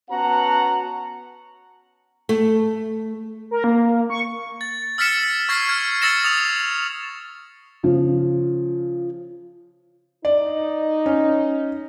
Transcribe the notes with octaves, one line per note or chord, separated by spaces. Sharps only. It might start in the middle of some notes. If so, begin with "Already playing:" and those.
B3 C#4 F#4 F#5 A5 A#5
A3
A#4
A#3
C#6
A6
E6 F6 A6 B6 C#7 E7
C#6 F6 G#6 A#6 C7
F6 G#6
E6 A6 A#6 C#7 E7
D#6 F7
C#3 F3
D#4 D5
C#4